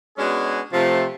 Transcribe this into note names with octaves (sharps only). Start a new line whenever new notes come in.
G#3 B3 C#4 D4 F#4 G#4
C3 F3 A3